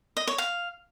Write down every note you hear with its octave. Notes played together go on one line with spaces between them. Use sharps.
D#5
C#5
F5